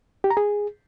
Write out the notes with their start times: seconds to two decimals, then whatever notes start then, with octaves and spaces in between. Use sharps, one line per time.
0.24 G4
0.30 A#5
0.37 G#4